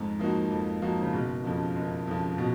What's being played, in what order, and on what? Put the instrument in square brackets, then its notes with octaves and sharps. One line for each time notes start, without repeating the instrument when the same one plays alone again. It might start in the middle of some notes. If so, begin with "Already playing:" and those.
Already playing: [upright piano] F2 [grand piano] G#2
[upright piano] F3 A#3 D#4 F#4
F2
F3 A#3 D#4 F#4
[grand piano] C#3
[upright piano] F#1 [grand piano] B2
[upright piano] F2 C#3 F3
F#1
F2 C#3 F3
[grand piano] B2